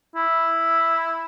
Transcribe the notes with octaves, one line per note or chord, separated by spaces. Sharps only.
E4